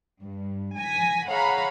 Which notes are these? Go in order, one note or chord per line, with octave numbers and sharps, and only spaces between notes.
G2
G#5 A#6 B6
G#4 C#5 F5 F#5 A#5 B5